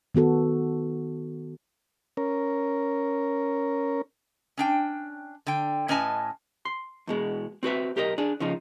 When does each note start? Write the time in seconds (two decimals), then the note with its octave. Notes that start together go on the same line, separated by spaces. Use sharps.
0.15 D#3 B3 F#4 A4
2.17 C#4 A#4
4.57 C#4 D4 G5
5.47 D3 G5
5.88 A2 C#4 B4 D#5 G#5 A5
6.65 C6
7.07 E2 B2 G#3
7.63 C4 F#4 B4 E5
7.96 B1 G4 A#4 C#5 D#5
8.18 D4 G#4
8.40 C#3 F3 D#4